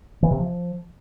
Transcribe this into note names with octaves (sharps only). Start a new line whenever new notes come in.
E3
C3
F3